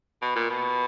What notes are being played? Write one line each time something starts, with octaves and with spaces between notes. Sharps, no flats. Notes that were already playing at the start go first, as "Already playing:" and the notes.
B2
A#2
B2